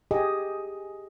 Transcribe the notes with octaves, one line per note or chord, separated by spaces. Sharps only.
G4 G#4 D#5